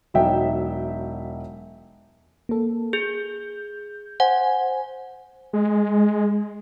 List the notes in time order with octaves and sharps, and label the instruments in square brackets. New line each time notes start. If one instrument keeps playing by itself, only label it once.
[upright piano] E1 F#3 D#4 E5 G5
[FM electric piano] A#3 A4
[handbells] G#4 [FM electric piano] G6
[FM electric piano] C5 G#5 [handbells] F#5
[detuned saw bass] G#3